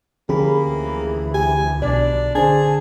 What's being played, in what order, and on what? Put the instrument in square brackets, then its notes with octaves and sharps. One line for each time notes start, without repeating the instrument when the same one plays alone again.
[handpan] D3 F3 C#4 [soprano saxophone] A#3 [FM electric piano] G4 G#4 B5
[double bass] D2 E3
[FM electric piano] G4 [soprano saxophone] G#5
[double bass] B1 [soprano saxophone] D4 [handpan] D5
[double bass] D3 [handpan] D4 C5 [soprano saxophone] G#4 [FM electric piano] G#5 A5